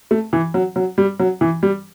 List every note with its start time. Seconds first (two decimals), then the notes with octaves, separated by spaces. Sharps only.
0.11 A3
0.33 E3
0.54 F#3
0.76 F#3
0.98 G3
1.20 F#3
1.41 E3
1.63 G3